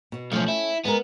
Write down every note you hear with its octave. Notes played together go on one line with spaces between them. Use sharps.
B2 B3
B1 F3 A3 C#4
E4
G#3 B3 A#4